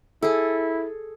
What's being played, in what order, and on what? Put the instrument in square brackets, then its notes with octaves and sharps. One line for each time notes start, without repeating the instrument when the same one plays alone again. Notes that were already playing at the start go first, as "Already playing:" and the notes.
[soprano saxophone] E4 [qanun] G#4 A4